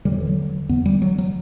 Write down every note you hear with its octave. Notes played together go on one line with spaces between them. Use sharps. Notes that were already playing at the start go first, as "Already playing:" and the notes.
E2 D3 G3
F#3
E3
F#3
E2 D3 B3
G3
F#3
F#3